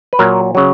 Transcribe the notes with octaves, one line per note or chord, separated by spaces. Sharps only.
B4
A#2 F#3 A#4
C#3 F#3